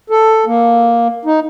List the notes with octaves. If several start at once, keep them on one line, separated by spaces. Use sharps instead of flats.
A4
A#3
D#4